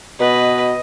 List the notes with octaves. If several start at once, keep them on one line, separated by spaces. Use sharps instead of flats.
B2 B4 D#5